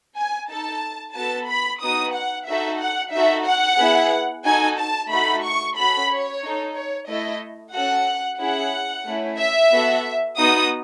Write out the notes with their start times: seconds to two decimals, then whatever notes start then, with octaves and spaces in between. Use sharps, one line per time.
0.17 G#5
0.50 D#4 A4 A5
1.15 B3 F#4 A4 A5
1.49 B5
1.82 B3 D#4 F#4 D#6
2.14 F#5
2.47 D#4 F#4 A4 E5
2.80 F#5
3.12 D#4 F#4 A4 E5
3.46 F#5
3.78 B3 E4 G#4
4.45 D#4 F#4 A4 G#5
4.78 A5
5.10 A3 D#4 F#4 A4 B5
5.44 C#6
5.76 C#4 F#4 A4 B5
6.09 C#5
6.42 D#4 A4
6.75 C#5
7.08 A3 E4 A4 D#5
7.74 C#4 F#4 A4 F#5
8.39 C#4 E4 G#4 F#5
9.06 A3 C#4 E4
9.39 E5
9.71 B3 F#4 A4
10.37 B3 D#4 F#4 D#6